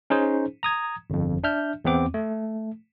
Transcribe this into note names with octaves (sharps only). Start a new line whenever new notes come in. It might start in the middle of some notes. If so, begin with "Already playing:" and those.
C#4 D#4 G#4 C5
A#5 D#6 G#6
G1 F2
D4 E5 F6 G6
E2 B3 C4 D6
A3